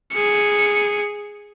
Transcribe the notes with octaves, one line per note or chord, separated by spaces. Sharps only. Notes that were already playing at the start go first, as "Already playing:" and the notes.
G#4 C#7